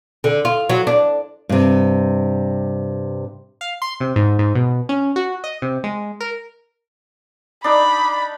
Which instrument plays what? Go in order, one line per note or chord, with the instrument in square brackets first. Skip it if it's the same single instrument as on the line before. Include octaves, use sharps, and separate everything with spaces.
[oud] D3
F4
F#3
D4
[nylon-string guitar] G2 C3
[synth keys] F5
C6
C3
G#2
G#2
B2
C#4
F#4
D#5
C3
G#3
A#4
[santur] D4 D#4 D5 [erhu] B5